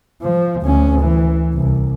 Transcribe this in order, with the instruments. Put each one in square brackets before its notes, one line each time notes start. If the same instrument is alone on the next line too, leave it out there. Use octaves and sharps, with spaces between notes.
[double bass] F3
D2 C#4
E3
C2